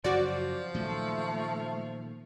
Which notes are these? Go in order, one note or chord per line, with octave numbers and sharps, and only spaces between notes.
F#2 C#3 F3 F#3 F#4 D5
A#2 D#3 F#3 A3